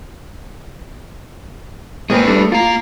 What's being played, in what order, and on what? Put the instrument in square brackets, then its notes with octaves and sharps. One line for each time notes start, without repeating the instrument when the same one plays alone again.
[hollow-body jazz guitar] G#2 A#3 C4 [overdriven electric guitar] G#4 B4
[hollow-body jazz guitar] G3 A3 D4
[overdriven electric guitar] A#3 A#5 [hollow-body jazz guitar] F4